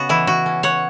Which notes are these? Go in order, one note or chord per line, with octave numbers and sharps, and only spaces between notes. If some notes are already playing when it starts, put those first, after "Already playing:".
Already playing: C#3 B3 F#4
E3 E4
F#4
C#4
C#5 F#5